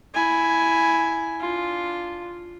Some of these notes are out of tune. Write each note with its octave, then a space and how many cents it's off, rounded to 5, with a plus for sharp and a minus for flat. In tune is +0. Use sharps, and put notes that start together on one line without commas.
E4 +0 G#5 +5
D4 +0 F4 +0